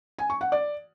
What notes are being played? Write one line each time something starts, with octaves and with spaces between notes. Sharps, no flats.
G#5
C#6
F#5
D5